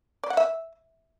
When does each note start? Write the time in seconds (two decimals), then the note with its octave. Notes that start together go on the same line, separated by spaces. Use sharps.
0.24 D5
0.30 F#5
0.37 E5